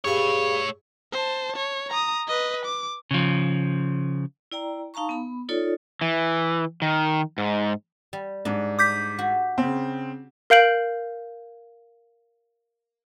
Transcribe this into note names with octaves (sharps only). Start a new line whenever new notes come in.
G2 A3 C#4 G#4 C#5 F5 B5 C#6
C5 A5
C#5
A#5 D#6
B4 D#5
D6
C#3 F3
E4 D5 G5 A#5
D#4 F5 A5 A#5 C#6
B3 B5
D#4 F4 A4 C#5 D5
E3
D#3
G#2
G3
G#2 D4
D6 G6 B6
F#4
C#3 C4
A#4 F5 G6 D7 F#7